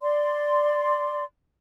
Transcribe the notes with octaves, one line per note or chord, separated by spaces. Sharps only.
D5 C6